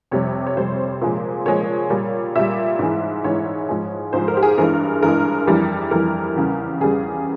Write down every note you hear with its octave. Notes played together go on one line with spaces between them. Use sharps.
F2 C3 G3 C#5
C#5
F2 C3 G3 C5
A#2 F3 G#3
A#2 F3 G#3 C#5
A#2 G3
A#2 G3 E5
G#2 E3 G#3
G#2 E3 G#3 C#5
G#2 F3 G#3
G#2 F3 G#3 C5
A#4
G4
G#4
G2 E3 G#3 A#4
G2 E3 G#3 A#4
F2 E3 G3
F2 E3 G3 A#4
E2 C#3 G3
E2 C#3 G3 G#4